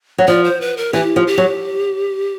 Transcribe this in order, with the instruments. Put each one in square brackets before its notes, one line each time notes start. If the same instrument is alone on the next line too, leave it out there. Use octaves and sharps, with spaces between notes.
[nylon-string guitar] F#3
[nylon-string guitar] F3 [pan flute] D5
[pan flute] C5
B4
A#4
[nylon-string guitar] E3 [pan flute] G4
[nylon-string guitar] F3
[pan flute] G4
[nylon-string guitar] F#3